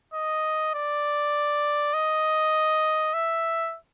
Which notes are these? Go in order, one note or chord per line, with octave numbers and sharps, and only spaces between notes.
D#5
D5
D#5
E5